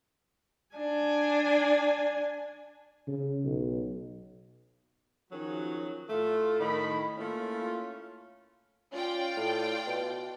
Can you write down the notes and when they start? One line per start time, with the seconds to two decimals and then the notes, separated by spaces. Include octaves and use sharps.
0.76 D4 G#5
3.07 C#3
3.44 B1
5.31 D#3 F3 F#3 C#4 F#4 G#4
6.10 A2 A3 F4
6.60 A2 D#3 B5
7.18 A3 A#3 C#4 E4 F4
8.92 C#4 F4 D5 G5
9.37 A2
9.87 B2